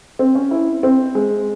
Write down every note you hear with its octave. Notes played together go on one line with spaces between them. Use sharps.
C4
C#4
E4
C4
G#3